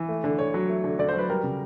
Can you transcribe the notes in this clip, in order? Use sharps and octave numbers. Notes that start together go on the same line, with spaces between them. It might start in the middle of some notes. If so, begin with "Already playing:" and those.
Already playing: E3
A3
D3
D3 C#5
F#3
A3
D3
D3 D5
C5
F#3
B4
G3 A#4
C#3